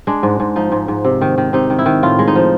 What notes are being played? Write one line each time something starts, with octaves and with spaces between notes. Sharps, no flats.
G#3 D4
G#2
G#2
F3 D#4
G#2
G#2
C3
D#3
D#3
C3 D#4
D#3
E4
D#3
A2 F4
G#3
D#4
F3